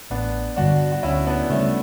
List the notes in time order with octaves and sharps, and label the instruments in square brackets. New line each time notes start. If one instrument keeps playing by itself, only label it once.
[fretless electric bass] A1 [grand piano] B3 D4
[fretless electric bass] G2 D3 G3 [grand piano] D4 F#4
[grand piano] F#4
[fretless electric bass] D2 [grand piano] C#4 E4
[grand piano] B3 D4
[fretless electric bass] C#3 G3 [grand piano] A3 C#4